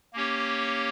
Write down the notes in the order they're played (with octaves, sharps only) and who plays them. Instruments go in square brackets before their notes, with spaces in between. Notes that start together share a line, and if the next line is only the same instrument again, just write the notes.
[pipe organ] A#3 C#4 G4 C#5